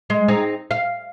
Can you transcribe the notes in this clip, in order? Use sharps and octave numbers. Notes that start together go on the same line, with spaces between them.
G#3
C4 D#4 G#4
F5